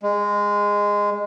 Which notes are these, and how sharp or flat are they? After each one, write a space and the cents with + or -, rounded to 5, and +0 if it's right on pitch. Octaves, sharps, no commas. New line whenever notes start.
G#3 -15